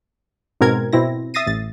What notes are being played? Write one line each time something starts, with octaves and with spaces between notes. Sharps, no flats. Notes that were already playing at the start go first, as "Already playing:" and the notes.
G#2 B2 C4 A#4 G#6
B2 C4 E4 A#6
E5 D#6 A6 A#6 C7 D#7
A1 A6